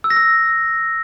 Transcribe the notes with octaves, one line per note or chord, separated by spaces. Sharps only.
E6
A#6
E6